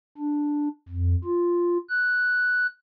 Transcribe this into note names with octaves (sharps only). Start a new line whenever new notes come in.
D4
F2
F4
F#6